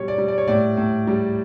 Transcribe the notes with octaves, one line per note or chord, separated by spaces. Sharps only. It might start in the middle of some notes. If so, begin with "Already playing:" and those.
Already playing: B2 G3 C#5
D5
G3
D5
C#5
A2 D5
A2
G3